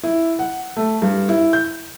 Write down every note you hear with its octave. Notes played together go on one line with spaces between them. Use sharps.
E4
F#5
A3
G2
E4
G6